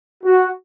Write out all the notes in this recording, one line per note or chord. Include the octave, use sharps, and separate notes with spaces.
F#4